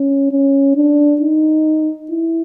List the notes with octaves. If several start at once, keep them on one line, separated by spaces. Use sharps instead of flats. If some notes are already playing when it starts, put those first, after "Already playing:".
Already playing: C#4
C#4
D4
D#4
E4